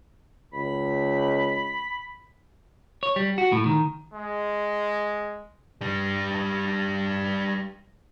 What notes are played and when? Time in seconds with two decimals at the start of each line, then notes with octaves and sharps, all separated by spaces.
0.53 C#2 B5
3.03 C#5
3.16 G3
3.38 F#4
3.52 A2
3.66 D#3
4.13 G#3
5.81 G3 D4